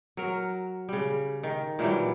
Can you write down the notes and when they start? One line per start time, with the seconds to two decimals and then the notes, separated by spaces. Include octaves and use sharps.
0.17 F#3 A#4
0.89 C#3 G3
1.43 D#3
1.79 A#2 E3 F#3 G3